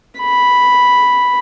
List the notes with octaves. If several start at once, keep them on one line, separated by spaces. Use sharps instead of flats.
B5